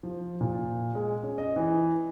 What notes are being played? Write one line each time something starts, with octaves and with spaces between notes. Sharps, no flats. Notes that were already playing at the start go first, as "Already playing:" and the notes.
F3
A#2
G#3
C#4
D#5
E3